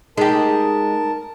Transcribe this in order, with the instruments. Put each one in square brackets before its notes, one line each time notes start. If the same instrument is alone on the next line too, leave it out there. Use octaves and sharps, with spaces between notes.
[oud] G#3 G4 [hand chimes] D#4 [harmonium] A#4 A5